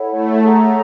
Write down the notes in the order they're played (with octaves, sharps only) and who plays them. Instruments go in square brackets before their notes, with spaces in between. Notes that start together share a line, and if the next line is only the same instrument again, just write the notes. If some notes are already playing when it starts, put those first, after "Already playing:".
Already playing: [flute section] E4 A4 C#5 F#5
[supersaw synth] A3
[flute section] G#4 C#5 F#5 A#5